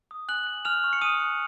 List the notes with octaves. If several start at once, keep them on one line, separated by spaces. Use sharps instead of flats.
D#6
G#5 F#6 F#7
F#6
G#5 F6 F7
C#6
C#7
G#5 D#6 D#7
F#6